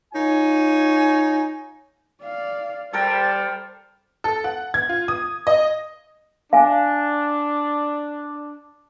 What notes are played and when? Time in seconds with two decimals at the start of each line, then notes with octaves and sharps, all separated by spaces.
0.14 D#4 F4 C#5 G#5
2.23 D5 F5
2.93 G3 A4 A#4 C5 G5 A6
4.24 A4
4.44 F#5
4.74 G#6
4.89 F4
5.08 D#6
5.47 D#5
6.53 D4 F5 G#5